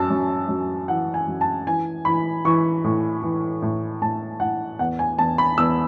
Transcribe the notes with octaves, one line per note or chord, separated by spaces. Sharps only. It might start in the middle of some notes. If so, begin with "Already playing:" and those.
Already playing: F#2 A5 E6
F#2
F#2
E3 F#5
G#5
F#2
A5
E3 G#5
E3 B5
E3 C#6
A2
E3
A2
A2 A5
A2 F#5
E2 F#5
G#5
E2 A5
B5
E2 E6